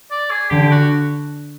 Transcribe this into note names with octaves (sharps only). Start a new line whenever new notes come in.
D5
G#4
D3 G4
F#4